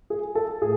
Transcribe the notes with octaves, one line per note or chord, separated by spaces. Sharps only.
G#4
A4
A2 G#4